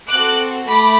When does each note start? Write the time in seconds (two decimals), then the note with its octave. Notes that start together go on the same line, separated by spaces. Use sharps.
0.09 C4 F#4 A4 D6 F#6
0.68 A3 B5 D6